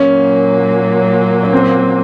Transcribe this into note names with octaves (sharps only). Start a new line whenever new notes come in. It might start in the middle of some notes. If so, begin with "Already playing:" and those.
Already playing: A#2 F#3 A#3 C#4
C#4
C4